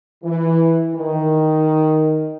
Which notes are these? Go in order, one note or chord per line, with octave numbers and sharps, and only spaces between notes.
E3
D#3